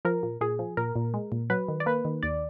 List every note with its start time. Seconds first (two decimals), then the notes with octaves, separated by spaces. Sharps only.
0.05 F3 A#4
0.23 A#2
0.41 A#2 G#4
0.59 F3
0.77 A#2 A#4
0.96 A#2
1.14 G#3
1.32 A#2
1.50 F#3 B4
1.68 D#3
1.80 D5
1.86 A#3 B4
2.05 D#3
2.23 D#2 D5